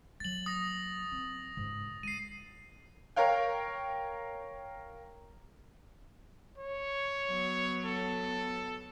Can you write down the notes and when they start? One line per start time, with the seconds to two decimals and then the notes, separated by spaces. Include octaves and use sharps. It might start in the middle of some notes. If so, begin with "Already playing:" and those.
0.20 F#3 A#3 A6 F#7
0.46 D#6 A#6
1.12 C4
1.57 G#2 C#3
2.03 G#3 C7 D#7
3.16 A#4 C#5 F5 G5
6.58 C#5
7.28 F#3 B3
7.84 A4